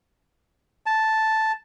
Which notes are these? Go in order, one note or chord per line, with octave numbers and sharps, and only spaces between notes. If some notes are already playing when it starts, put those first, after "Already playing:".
A5